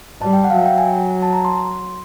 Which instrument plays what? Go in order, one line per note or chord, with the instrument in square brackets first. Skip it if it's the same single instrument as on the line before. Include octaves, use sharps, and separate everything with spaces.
[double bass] G3 [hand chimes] A5
[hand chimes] G5
F#5
F5
[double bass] F#3 [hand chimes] E5
[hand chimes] G5
G#5
A5
A#5
C6